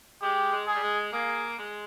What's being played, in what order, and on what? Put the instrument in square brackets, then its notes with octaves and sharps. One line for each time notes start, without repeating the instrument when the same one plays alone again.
[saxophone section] G#3 [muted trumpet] G4
[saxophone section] G#3
[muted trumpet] G#4
[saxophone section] G3
G#3
[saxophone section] A#3 [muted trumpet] G#4
[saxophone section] G#3